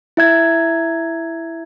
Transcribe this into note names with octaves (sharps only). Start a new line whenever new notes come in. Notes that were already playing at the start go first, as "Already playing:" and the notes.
E4 E5 G#6